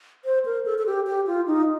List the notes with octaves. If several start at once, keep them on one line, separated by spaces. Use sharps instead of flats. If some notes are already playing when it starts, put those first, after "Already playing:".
C5
A#4
A4
A4
G4
G4
F4
D#4